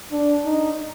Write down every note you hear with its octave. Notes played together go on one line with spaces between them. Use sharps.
D4
D#4